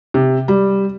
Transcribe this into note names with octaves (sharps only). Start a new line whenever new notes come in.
C3
G3